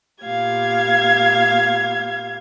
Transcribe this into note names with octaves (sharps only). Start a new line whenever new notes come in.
A#2 B3 G4 F5 G#6